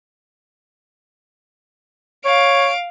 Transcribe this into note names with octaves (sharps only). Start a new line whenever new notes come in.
C#5 F5 D7